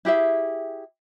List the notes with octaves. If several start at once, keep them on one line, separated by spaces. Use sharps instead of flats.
E4 G4 G#4 E5